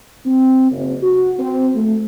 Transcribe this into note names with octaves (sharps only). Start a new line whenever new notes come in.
C4
F#1
F#4
C4
A3